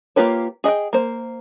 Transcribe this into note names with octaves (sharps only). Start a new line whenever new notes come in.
A#3 F4 G4 B4 C#5
G#4 D#5 E5 G5
A#3 C5